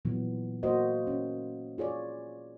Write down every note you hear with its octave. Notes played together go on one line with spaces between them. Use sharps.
A#2 E3 F#3 B3
A#3 F#4 C5 D#5
C#4
F4 G#4 C#5 D5